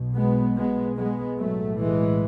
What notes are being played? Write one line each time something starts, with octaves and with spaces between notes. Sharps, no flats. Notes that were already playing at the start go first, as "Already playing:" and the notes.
Already playing: B1 B2
G#3 B3
G#3 B3
G#3 B3
B1 A2 F#3 A3
E3 G#3